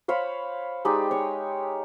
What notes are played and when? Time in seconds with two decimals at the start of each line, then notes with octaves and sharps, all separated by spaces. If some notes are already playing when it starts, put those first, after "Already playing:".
0.08 C5 C#5 F5 B5
0.85 G#3 D#4 G4 D5
1.11 C#5 C#6